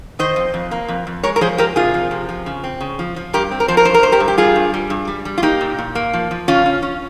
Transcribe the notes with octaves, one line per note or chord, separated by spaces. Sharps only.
D#3 C5 D#5
F2
F2
A#3
F2
F2
G#3 A#4 C#5
A#4
F3 G#4 C5
G#3 G4 A#4
C3 F4 G#4
F3
C3
F3
C#3
C4
C#3
F3
F3
G2 G4 A#4
C4
A#4
F3 C5
A#4
G2 C5
A#4
G2 C5
G4 A#4
G2
G4
G3 F4 G#4
G2
G3
G2
G3
G3
F4
A#3 D#4 G4
A#2
A#2
A#3
F3
F3
C#3 C#4 F4
C#4
C#4